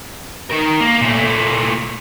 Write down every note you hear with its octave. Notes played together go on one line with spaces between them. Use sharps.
D#3 A#4
A#3
A#2 A3